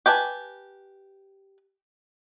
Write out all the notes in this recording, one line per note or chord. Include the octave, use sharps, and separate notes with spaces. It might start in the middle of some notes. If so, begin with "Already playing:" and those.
G4 B4 G#5 A5